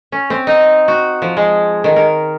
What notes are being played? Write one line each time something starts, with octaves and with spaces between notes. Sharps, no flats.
C#4
C4
D#4
F#4
F3
G#3
D#3
A#4